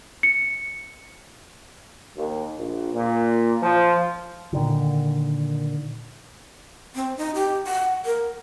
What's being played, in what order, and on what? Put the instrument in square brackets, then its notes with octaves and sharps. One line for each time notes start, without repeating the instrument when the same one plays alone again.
[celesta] C#7
[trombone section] D#2
A#1
A#2
F3
[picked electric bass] A#2 D3 D#3
[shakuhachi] C4
D#4
G4
F#5
A#4